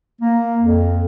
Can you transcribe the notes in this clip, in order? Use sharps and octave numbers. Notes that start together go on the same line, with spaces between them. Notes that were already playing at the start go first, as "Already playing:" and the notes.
A#3
F2